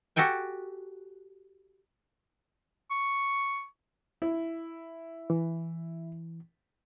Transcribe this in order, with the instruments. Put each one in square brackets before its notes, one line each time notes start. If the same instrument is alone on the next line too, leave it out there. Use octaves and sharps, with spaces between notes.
[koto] F#4 G4 A4 G5 G#5
[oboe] C#6
[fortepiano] E4
[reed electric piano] E3